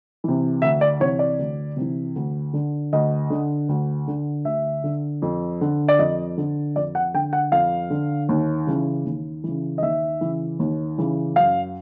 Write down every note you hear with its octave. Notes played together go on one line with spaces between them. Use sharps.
C3 E3
D2 E5
D5
C3 E3 C#5
D5
D2
C3 E3
D2
D3
D2 D#5
D3
D2
D3
D2 E5
D3
F2
D3
D5
F2 D#5
D3
F2 D5
F#5
D3 G5
F#5
F2 F5
D3
D#2
C#3 E3
D#2
C#3 E3
D#5
D#2 E5
C#3 E3
D#2
C#3 E3
F#2 F5